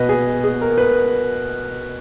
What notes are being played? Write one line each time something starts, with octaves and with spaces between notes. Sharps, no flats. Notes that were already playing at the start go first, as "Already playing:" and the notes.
Already playing: B2 B4 D#5
G#4
G#4
A#4
B4